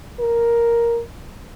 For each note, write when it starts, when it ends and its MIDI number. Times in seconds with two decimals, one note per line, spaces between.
0.20 1.01 70